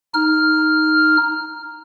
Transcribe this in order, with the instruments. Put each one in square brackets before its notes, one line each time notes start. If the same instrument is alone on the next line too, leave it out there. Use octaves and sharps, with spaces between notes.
[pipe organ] D#4 F6